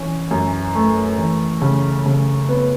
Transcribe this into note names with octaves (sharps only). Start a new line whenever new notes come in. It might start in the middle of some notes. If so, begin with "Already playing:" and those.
Already playing: E3 C#4
F#2
A3
E3
C#3
C#3
B3